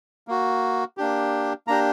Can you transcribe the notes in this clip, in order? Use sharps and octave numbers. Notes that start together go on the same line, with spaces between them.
A#3 F#4
A#3 D4 G4
A#3 D4 G4 A#5